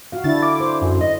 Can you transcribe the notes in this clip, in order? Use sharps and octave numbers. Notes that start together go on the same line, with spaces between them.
F#4 F5
D3 D4 E4 A6
D6
C5
F#2
D#5